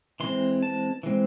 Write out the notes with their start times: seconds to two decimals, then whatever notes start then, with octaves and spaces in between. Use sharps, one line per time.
0.20 E3 G#3 C4 C6
0.63 A5
1.03 E3 G#3 C4